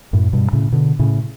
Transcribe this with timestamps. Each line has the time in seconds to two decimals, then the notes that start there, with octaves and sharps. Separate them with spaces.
0.13 F#2 A2
0.33 G2 B2
0.53 A2 C#3
0.72 B2 D3
0.99 A2 C#3